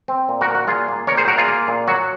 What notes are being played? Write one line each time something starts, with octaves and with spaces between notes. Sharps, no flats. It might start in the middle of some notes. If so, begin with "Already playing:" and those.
C4
A#2
F#4 A#4
A#2
F#4
A#2 F4 G#4
A#3
A#2 A#4 C#5
G#4 C5
A#2 F#4 A#4
F4 G#4
A#3
A#2
F#3 F#4